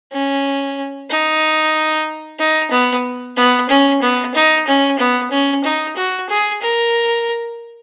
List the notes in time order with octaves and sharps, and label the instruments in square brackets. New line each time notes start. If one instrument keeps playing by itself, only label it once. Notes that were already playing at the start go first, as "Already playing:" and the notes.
[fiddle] C#4
D#4
D#4
B3
B3
C#4
B3
D#4
C#4
B3
C#4
D#4
F#4
G#4
A#4